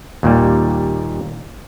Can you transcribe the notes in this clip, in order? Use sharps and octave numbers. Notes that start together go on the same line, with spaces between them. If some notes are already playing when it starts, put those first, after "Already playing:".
D#2 A#2 G3